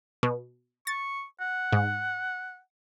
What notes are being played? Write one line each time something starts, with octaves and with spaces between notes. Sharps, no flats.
B2
C#6 A6
F#5
G#2